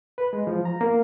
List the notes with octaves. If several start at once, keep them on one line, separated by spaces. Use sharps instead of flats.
B4
G#3
F3
A#5
A#3